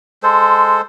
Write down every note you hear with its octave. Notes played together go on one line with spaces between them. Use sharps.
G#3 A4 C5